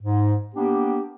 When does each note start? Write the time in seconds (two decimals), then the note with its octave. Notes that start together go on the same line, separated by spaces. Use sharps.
0.01 G#2
0.55 A#3 B3 D4 G4